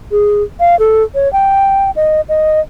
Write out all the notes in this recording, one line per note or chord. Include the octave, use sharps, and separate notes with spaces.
G#4
F5
A4
C#5
G5
D#5
D#5